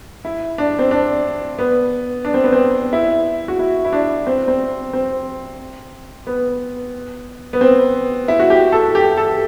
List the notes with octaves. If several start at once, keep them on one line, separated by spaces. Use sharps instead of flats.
E4
D4
C4
D4
B3
D4
C4
B3
C4
E4
F#4
E4
E4
D4
C4
C4
C4
B3
B3
C4
E4
F#4
G4
A4
G4
A4